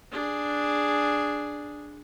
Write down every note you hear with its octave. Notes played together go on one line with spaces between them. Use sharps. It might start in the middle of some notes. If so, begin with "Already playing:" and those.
D4 G#4